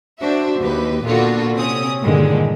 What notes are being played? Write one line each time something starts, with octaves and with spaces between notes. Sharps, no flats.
D4 F#4 C5 E5
D#2 G4 B4
A#2 D3 B3 F4 F#4
C3 C4 C#4 D#6
G2 A#2 D3 D#3 G#3